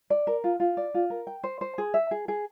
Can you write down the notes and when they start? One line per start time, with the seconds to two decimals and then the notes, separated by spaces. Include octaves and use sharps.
0.10 D5
0.27 A#4
0.44 F4
0.60 F4
0.77 D5
0.94 F4
1.10 A#4
1.27 G5
1.44 C5
1.61 C5
1.78 G#4
1.94 E5
2.11 G#4
2.28 G#4